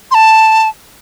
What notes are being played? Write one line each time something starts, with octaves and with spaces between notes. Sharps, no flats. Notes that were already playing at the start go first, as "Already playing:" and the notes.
C6
A5